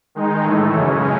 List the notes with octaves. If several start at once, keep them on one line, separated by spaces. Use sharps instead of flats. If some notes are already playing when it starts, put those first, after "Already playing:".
D#3 G#3 D#4
A2 E3 A3
F#2 C#3 G#3 C#4